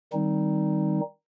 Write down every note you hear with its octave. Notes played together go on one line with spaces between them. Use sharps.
D#3 G3 C4 D#4